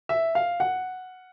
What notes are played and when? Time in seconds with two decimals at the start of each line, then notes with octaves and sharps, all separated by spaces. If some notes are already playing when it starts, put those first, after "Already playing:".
0.09 E5
0.35 F5
0.60 F#5